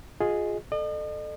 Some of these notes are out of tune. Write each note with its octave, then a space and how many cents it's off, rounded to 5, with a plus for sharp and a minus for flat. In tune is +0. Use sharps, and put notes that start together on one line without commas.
F4 +25 G#4 +0 D#5 +0
A4 +0 D#5 -45